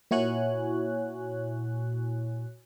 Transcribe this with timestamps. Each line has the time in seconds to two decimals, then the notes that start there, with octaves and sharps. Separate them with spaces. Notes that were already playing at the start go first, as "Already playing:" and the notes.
0.11 A#2 E4 F#4 C#5 G#5 F#6